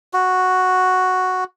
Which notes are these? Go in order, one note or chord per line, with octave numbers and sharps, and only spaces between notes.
F#4